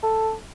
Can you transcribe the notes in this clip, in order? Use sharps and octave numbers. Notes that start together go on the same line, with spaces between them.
A4